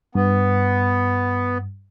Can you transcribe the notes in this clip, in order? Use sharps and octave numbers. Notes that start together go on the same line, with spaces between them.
G2 B3